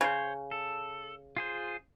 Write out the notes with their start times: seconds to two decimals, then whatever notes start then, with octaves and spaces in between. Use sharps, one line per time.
0.01 C#3 C5 C#5
0.51 A4
1.37 F4 G#4 C5